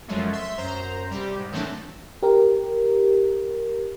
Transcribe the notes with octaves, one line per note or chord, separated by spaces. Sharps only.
F#2 F3 F#3 G#3 A3
E5 C6
F#2 C5 A#5
C3 G3
G#2
D#3 E3 F#3 A3 C4 D4
G4 A#4